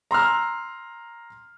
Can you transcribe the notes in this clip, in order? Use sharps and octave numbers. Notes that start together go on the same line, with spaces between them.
A#5 C6 E6 F6